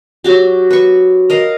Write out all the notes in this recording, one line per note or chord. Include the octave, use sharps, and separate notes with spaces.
F#3 F#4 G4
B4 C#6
A#4 D#5 F5